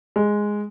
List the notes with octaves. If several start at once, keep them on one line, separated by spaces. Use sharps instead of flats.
G#3